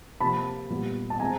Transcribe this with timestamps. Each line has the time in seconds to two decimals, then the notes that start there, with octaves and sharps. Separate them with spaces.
0.20 C3 F3 A#3 A5 B5
0.70 A#2 G3 B3
1.10 A5
1.20 G#3 C4 G#5 A#5